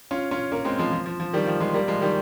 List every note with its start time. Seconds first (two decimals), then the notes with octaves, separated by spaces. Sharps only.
0.11 C#4 F4
0.31 C#4 F4
0.52 A#3 C#4
0.65 G#3 C4
0.79 F3 G#3
0.93 F3
1.06 F3
1.20 F3
1.33 D#3 G3
1.47 F3
1.60 F3 G#3
1.74 G3 A#3
1.88 F3 G#3
2.01 D#3 G3